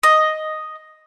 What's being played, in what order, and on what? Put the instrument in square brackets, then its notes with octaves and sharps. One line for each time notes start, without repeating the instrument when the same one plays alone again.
[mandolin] D#5